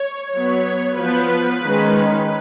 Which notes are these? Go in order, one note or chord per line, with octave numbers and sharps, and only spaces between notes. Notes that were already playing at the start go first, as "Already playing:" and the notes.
Already playing: C#5
F#3 B3 C#5
F3 B3 B4
D#3 G#3 C#4